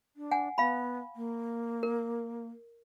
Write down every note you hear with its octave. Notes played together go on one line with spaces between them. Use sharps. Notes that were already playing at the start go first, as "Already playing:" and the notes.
D4
F#5 G#5
B3 F5 B5
A#3
A#4